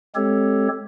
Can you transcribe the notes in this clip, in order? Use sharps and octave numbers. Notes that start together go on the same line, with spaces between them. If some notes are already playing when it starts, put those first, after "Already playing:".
G#3 C4 G4 A4 C#5